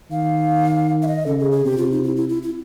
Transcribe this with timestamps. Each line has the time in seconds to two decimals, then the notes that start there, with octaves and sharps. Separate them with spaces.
0.11 D#3 F5
1.02 E5
1.07 D#5
1.26 C#3 A4
1.39 G#4
1.51 G#4
1.65 C3 G4
1.77 F4
1.91 D#4
2.03 E4
2.16 E4
2.29 E4
2.43 E4